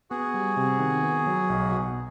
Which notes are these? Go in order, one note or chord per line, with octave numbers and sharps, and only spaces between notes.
B3 F#4 G#4
G3
C3
D#3
B3
F#3
B1
B2